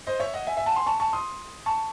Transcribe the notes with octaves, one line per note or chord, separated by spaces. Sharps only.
C5 D#5
C#5 E5
D#5 F#5
E5 G#5
E5 G#5
F#5 A5
G#5 C6
A5 C#6
A5 C#6
C6 D#6
A5 C#6